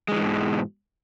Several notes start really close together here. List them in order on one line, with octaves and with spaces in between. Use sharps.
G#3 D#3 E3 G#2 B2